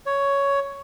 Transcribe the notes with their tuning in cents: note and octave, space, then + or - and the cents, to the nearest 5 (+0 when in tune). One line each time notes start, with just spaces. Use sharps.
C#5 +10